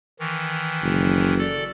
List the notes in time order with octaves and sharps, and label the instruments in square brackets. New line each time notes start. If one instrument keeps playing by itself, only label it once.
[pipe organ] D#3 E3
[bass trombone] F#1
[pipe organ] A4 D5